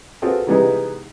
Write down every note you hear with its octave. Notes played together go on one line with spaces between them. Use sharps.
B3 C4 F4 F#4 G#4 A4
C3 E3 G3 G#3 B3 D#4